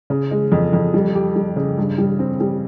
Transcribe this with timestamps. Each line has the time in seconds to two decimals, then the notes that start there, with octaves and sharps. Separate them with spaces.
0.10 C#3
0.31 G#3
0.52 F2
0.73 F2
0.94 G3
1.15 G4
1.36 G3
1.56 C#3
1.78 G2
1.98 G3
2.19 C4
2.40 G3